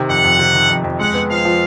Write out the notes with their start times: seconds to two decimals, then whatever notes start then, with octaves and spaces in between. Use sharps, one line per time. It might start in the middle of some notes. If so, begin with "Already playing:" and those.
Already playing: C3 D#3
0.09 F2 F#5
0.24 F2
0.39 C3
0.54 D#3
0.69 F2
0.84 F2
0.99 G#3 F#5
1.14 B3
1.30 F3 F5
1.45 F3